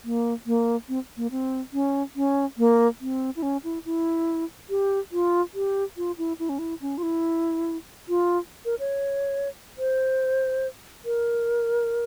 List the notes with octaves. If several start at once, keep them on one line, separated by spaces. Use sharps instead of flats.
A#3
A#3
C4
A#3
C4
C#4
C#4
A#3
C4
E4
C#4
E4
E4
G4
F4
G4
F4
E4
E4
C#4
E4
C#4
F4
E4
F4
A#4
C#5
C5
A#4